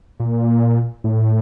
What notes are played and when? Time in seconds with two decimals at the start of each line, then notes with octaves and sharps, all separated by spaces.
0.20 A#2
1.04 A2